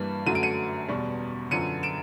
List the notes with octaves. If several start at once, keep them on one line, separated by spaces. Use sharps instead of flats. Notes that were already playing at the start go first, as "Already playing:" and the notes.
Already playing: G2 E3 G3 A#3
F#2 D3 F#3 A3 D#7
D7
C#7 D#7
E2 B2 G3
F#2 D3 F3 C#7 D#7
D7 E7